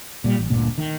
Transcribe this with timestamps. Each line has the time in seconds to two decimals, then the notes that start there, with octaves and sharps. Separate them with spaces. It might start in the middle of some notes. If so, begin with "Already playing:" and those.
0.24 A#2 F#3 G3
0.39 A1
0.50 G1 D2 A#2 B3
0.78 D#3